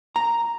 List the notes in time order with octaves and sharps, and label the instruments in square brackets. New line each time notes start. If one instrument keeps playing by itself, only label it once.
[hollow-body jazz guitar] A#5